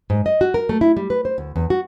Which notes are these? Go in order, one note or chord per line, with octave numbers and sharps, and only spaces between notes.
G#2
D#5
F#4
A#4
A3
E4
G3
B4
C5
D2
E2
F#4